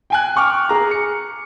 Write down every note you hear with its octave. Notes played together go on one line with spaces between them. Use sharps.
G5 G#5 F#6
G5 C#6 D6 F6
G#4 A#5
C#7